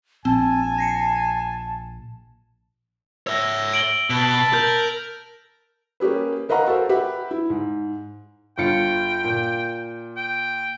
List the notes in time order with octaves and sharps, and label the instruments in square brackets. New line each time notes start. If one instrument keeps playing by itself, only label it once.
[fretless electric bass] A#1 [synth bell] C4 [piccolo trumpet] G#5 [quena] A5
[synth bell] A#6 C7 C#7
[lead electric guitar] C#5 E5 [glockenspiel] E6 A#6
[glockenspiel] D7 F#7 G7
[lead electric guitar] B2 [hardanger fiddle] A5 B5
[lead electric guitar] A#4 [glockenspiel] G6
[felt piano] A#3 C#4 G4 G#4 B4
A#4 B4 D#5 F5 F#5 A#5
F#4 A4 A#4 C5
G4 B4 E5 F#5 B5
E4
G#2
[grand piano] G1 F4 C#7 [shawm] G5
[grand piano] A#2
[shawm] G5